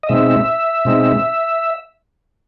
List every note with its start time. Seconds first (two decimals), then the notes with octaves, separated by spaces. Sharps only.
0.03 D#5
0.09 B2 G#3 C4 D#4 E5
0.85 B2 G#3 C4 D#4